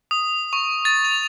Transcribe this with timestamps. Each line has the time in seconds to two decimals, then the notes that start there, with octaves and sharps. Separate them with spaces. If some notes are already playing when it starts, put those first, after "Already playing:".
0.11 D#6
0.53 C#6
0.85 A6
1.05 F7